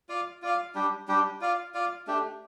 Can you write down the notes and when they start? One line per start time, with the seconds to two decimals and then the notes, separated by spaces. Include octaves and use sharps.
0.09 F4 D5 F5
0.42 F4 D5 F5
0.75 G3 D4 G4
1.08 G3 D4 G4
1.41 F4 D5 F5
1.74 F4 D5 F5
2.07 A3 D4 G4